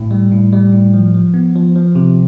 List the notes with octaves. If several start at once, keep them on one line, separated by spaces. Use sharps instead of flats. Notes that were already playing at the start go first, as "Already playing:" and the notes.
Already playing: A2
G3
A2
G3
A2
F3
F3
B3
F3
F3
C3